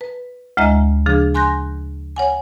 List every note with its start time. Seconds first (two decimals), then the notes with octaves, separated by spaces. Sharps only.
0.01 B4
0.57 D2 G#3 E4 D#5 E5 A#5
1.06 C#3 F3 D4 G#4
1.34 G#5 C6 F#6 G6 A#6
2.16 C#5 F#5 G#5